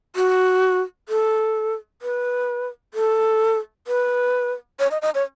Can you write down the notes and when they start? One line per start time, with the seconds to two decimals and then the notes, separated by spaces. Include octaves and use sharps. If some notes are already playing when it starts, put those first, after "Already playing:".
0.16 F#4
1.09 A4
2.02 B4
2.94 A4
3.87 B4
4.79 C#5
4.91 D#5
5.02 D#5
5.15 C#5